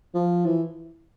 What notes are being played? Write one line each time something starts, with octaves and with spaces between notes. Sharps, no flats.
F3
E3